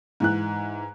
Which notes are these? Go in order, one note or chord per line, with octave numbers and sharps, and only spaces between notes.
G#2 E3 F#6